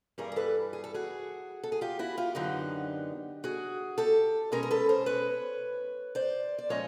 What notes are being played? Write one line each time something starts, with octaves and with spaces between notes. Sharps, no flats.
G2 E3 G3 G#4 A#4
A#4
A4 B4
G#4
A4
F#4 G#4
A4
G#4
F4 G4
E4 F#4
F4 G4
F#2 D3 F#3 B3 D#4
F#4 G#4
G4 A4
B2 G#3 C#4 G#4 A#4
A#4
A4 B4
A#4 C5
B4 C#5
C5 D5
D5
A#2 F3 G#3 C#4 C#5 D#5